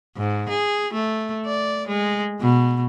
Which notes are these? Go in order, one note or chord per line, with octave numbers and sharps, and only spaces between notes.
G#2
G#4
A3
D5
G#3
B2